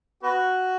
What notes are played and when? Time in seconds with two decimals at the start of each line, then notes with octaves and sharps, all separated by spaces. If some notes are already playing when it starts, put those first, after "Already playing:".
0.23 B3 F#4